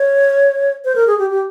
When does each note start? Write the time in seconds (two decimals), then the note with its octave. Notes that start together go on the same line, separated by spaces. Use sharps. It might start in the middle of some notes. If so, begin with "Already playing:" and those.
Already playing: C#5
0.85 C5
0.96 A#4
1.07 G#4
1.19 G4
1.30 G4